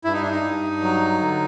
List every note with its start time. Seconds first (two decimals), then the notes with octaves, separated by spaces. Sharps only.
0.04 G2 E4
0.14 D#4
0.22 D4
0.31 D#4
0.43 G2
0.82 F#3
1.20 D3